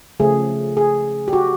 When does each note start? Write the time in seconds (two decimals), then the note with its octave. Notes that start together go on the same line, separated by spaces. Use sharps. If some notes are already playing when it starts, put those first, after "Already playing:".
0.20 C#3 F3 A3 G#4
0.77 G#4
1.28 G4
1.33 F#4